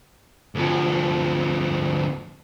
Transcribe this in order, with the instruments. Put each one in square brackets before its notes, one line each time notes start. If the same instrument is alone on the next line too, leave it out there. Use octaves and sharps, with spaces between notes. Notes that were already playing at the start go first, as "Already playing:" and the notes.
[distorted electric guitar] D2 F3